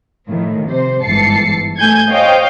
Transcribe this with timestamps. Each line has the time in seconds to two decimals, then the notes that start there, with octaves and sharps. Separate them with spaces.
0.27 A2 D#3 F3
0.66 C3 C5
1.03 G1 G#2 E3 A5 C7 C#7
1.78 A3 G#5 G6 G#6
2.10 C5 C#5 D#5 F5 G5 G6